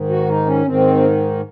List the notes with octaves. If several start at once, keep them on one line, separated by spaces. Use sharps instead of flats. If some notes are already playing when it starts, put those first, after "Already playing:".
Already playing: G#2 D#3
F#4
D#4
C#4
G#2 D#3 C4